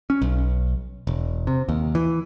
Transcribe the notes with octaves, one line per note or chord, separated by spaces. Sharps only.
C#4
B1
E1
C3
D#2
E3